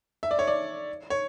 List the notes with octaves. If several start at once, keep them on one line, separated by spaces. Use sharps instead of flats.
E5
D5
C#5
D5
C#5